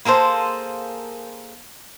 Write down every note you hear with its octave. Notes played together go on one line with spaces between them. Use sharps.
A#3 G#4 A4 C5